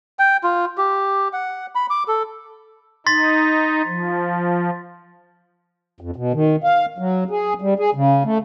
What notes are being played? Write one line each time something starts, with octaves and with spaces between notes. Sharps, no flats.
G5
F4
G4
F#5
B5
D6
A4
D#4 C6 A6 B6
F3
F2
B2
D#3
F5
F#3
G#4
G3
G#4
C#3
A3